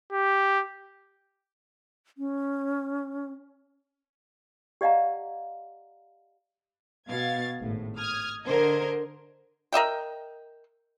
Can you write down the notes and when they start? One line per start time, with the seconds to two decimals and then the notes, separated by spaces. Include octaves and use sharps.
0.12 G4
2.18 C#4
4.81 G4 D5 D#5 F5 F#5 A#5
7.09 B2 F5 G#6 A6
7.59 G#1 A2
7.98 D#6 F6 G#6
8.44 D3 A#4 C5 D#5 G#6
9.73 A#4 D#5 E5 G5